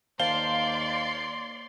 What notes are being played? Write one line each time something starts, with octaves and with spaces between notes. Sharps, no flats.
D#2 C5 D5 F5 A5 C6 G7